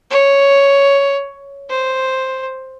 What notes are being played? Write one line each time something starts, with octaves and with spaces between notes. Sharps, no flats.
C#5
C5